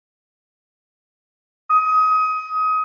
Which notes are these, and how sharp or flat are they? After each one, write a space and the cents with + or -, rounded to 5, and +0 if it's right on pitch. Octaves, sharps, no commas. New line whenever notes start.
D#6 +25